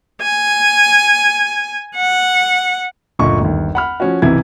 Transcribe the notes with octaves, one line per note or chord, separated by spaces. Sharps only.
G#5
F#5
F#1 D2 A#2 D#5 C#6
G1 D#2
F#5 B5 F6
F3 C#4 F#4
B1 F#2 C3 E3 E4 G#6